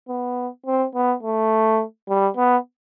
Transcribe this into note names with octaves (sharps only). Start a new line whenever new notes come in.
B3
C4
B3
A3
G3
B3